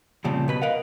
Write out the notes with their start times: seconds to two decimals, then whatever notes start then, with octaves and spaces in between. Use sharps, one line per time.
0.24 F2 A#2 C#3 F3 G3 C4
0.48 B2 B4 B5
0.62 A#4 B4 D#5 F5 F#5